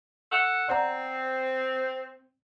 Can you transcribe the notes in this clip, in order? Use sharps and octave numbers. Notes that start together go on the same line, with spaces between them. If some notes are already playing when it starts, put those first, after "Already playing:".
A4 F#5
C4 D5 F#5 A#5